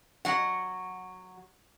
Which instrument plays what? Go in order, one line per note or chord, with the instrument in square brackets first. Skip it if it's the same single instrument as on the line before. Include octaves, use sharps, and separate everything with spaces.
[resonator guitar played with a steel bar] F#3 F#5